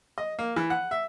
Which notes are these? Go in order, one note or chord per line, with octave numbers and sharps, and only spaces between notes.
D#5
A#3
E3
F#5
E5